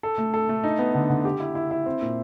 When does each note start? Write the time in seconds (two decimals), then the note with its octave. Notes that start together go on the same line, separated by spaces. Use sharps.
0.03 A4
0.18 A3
0.34 A4
0.49 A3
0.64 D#4
0.79 B3
0.95 D3
1.10 D3
1.25 G4
1.40 E4
1.55 E4
1.71 E4
1.86 C4
2.02 A#2